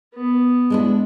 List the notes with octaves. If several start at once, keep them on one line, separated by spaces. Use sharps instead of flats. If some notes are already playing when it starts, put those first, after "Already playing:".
B3
G#3 D4 E4